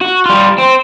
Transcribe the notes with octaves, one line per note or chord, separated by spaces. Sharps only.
F#4
G3 F4
C4